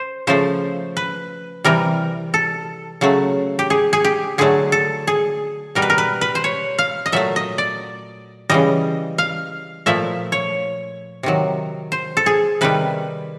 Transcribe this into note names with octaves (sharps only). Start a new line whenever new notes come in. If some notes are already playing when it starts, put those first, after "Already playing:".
Already playing: C5
C#3 F3 A3 C5
B4
C3 E3 G3 A#4
A4
C#3 F#3 A3
G4
G#4
G#4
G4
D3 F#3 A3 G#4
A4
G#4
B2 G3 A#4
B4
A#4
B4
B4
C5
C#5
F5
D#5
A#2 F#3 A3 E5
D#5
D5
C#3 E3 G3 D#5
F5
A#2 F3 A3 E5
C#5
C3 D#3 F#3
C5
A4
G#4
C3 D#3 G3 B4